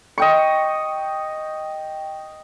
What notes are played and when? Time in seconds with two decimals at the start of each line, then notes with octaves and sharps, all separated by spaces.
0.18 D#5 G5 C#6